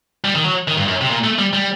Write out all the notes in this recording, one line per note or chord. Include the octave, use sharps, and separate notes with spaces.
G3
D#3
F#3
D#3
G2
F#2
C3
A#2
A3
G3
G3